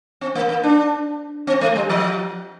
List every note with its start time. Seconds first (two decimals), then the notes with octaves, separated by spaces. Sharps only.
0.21 C4
0.35 A#3
0.49 A#3
0.63 D4
1.47 C4
1.61 A3
1.76 G3
1.89 F3